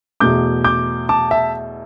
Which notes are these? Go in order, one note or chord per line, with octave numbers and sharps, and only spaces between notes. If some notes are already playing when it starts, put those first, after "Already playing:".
E2 B2 A3 D6 G6
D6 G6
A5 D6
E5 A5